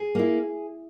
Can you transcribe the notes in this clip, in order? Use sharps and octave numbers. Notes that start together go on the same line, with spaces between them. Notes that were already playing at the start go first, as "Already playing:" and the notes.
Already playing: G#4
A#3 E4